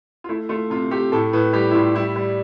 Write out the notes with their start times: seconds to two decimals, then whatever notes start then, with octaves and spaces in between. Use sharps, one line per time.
0.24 F4
0.29 A3 E4
0.49 A3 F4
0.70 C3 F4
0.91 A3 G4
1.12 A2 A4
1.33 A2 B4
1.53 G3 G4
1.71 E4
1.74 A2 F4
1.95 G3 E4
2.16 G3